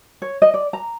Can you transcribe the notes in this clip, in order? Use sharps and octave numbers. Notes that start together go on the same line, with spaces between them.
C#5
D#5
D5
A#5